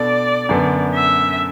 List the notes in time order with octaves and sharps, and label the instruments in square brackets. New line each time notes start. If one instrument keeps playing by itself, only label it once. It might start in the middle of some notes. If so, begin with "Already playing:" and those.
Already playing: [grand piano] B2 B3 D4 A4 [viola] D5
[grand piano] F#2 D3 B3
[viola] E5